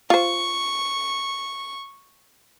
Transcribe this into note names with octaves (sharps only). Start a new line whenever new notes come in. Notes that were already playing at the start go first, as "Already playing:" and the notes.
F4 C5 C#6